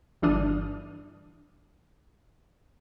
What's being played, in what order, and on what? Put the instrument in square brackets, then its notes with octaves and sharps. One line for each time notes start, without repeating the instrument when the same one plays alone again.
[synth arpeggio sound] G1 E3 D4 D#6 F6